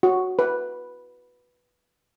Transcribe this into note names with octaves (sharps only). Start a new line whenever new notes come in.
F#4
B4